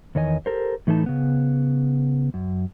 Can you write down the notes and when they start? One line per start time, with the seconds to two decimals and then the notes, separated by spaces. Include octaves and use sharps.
0.15 E2 D#3 C#5 D#5 G#5
0.46 G4 A4 A#4 C5
0.87 A2 E3 A3 D#4 A5
1.06 C#3 B3
2.34 F#2